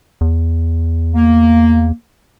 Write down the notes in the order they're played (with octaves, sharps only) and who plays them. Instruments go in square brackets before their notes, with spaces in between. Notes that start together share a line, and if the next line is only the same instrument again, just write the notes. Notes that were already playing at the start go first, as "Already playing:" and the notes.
[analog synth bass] E2
[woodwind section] A#3